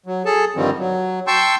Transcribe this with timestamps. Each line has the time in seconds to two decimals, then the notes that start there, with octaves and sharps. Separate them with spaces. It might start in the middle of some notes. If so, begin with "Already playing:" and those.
0.06 F#3
0.26 G#4 A4 A5
0.56 G2 D3 D#3 F3 G3 C4
0.78 F#3
1.27 G5 A5 C6 C#6 E6 G6